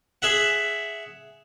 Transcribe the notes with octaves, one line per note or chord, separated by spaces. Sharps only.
G#4 E5 F#5